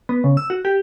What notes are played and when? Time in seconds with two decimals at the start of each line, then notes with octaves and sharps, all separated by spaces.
0.09 B3
0.24 C#3
0.37 E6
0.50 F#4
0.65 G4